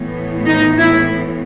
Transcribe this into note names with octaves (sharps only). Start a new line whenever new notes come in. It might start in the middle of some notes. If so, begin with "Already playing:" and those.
Already playing: A2 E3 B3
D#4
E4